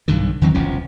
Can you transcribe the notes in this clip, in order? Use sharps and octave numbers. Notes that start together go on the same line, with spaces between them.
B1 G2 D3 D#3
E2 D#3 F#3 C4
E1 C2 F3 C#4